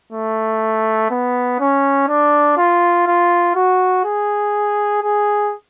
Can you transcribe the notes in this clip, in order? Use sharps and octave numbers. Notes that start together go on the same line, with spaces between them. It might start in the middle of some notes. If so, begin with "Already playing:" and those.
A3
B3
C#4
D4
F4
F4
F#4
G#4
G#4